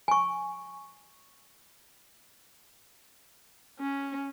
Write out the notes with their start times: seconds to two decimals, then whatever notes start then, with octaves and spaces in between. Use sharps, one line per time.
0.08 G#5 C#6
3.79 C#4